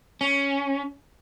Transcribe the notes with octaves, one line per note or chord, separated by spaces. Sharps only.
C#4